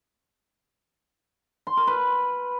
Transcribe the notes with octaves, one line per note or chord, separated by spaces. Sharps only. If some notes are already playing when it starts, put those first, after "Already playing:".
C6
A#4
B4